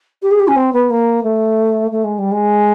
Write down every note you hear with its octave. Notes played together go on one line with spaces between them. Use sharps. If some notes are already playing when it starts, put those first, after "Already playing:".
G4
G#4
G4
C#4
C4
B3
A#3
A3
A3
G#3
G3
G#3